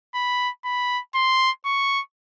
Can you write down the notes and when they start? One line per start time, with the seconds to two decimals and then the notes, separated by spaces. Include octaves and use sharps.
0.15 B5
0.65 B5
1.15 C6
1.65 C#6